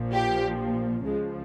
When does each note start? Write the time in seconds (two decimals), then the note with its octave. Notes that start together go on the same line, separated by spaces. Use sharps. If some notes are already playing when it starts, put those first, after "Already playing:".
Already playing: A#1 A#2 F3
0.13 G4
1.05 C#2 C#3 F3 G#3